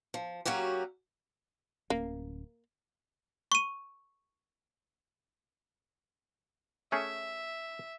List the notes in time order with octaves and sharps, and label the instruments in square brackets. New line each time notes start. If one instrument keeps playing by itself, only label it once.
[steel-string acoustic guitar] F3
F#3 A#3 C#4 F#4 G4
[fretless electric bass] D1 C#4 [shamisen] A#3
[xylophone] C#6 D#7
[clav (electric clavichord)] A3 C#4 G#4 [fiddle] E5